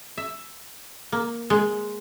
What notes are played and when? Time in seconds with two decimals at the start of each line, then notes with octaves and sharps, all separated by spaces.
0.18 E5
1.12 A#3
1.50 G#3